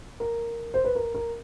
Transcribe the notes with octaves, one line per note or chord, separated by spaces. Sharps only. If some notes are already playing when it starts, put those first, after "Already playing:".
A#4
C5
B4
A#4
A#4